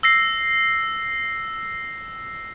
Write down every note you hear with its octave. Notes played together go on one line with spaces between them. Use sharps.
E6 A#6 C7